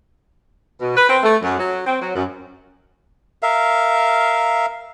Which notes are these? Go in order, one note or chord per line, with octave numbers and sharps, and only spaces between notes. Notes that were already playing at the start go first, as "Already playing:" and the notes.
B2
B4
C4
A3
F#2
F#3
C4
F#3
F#2
A#4 E5 F5